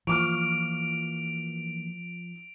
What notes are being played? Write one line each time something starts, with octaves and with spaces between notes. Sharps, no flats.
E3 F3 A#3 C#6 D6 F6 D7 F7